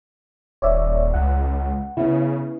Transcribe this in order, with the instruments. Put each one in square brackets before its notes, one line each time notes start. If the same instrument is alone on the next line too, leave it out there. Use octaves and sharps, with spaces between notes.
[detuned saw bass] D#1 [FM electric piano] C#5 D5 E5
[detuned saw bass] C#2 [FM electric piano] F#5
[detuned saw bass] C#3 [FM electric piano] B3 E4